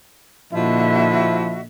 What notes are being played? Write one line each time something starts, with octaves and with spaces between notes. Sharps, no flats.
A#2 D3 F3 E4 F#4 D#5 E5